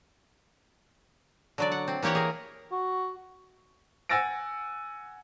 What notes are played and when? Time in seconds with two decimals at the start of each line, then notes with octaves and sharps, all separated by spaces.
1.58 D3 F#3 D5
1.72 F#5
1.88 C4
2.02 E3 A#3 G4 C#5 F#5
2.15 G#4 A#4
2.72 F#4
4.09 F#5 G#5 E6 A6 A#6 D7